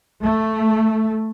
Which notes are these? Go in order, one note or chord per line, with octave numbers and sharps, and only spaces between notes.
A3